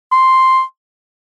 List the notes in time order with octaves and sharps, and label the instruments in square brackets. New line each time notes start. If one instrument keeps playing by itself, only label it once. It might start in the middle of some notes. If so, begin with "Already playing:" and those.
[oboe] C6